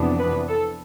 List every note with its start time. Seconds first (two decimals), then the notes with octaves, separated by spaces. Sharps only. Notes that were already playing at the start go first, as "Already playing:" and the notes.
Already playing: F2 C3 E3 B3 D4
0.19 B4
0.48 A4